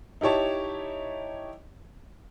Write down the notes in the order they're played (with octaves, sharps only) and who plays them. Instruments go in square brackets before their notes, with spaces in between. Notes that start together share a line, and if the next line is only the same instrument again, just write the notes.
[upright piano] D#4 E4 G4 C#5 A5